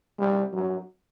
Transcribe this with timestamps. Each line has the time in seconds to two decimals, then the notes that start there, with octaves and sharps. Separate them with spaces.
0.19 G3
0.53 F#3